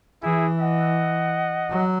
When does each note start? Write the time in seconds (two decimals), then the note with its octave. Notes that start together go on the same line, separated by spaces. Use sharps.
0.23 E3 E4 G#4
0.60 D#5 F#5
1.70 F#3